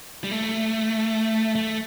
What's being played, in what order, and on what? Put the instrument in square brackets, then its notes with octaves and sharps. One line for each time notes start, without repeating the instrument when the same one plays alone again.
[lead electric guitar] G3
A3
A3